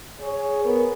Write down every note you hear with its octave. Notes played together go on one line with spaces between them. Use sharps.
G#4 C#5
B3 G#4 A#4